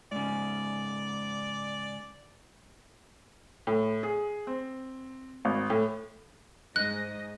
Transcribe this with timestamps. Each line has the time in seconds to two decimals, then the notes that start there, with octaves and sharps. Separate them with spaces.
0.12 G#2 C#3 D5
3.67 A2
4.03 G#4
4.47 C4
5.45 G#1
5.70 A2
6.76 G#2 D#5 F#6